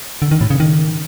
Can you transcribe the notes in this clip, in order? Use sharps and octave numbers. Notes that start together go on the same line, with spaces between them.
D3
D#3
A2
C#3
D#3